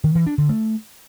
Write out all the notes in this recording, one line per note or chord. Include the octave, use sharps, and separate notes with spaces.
D#3
E3
D4
D3
A3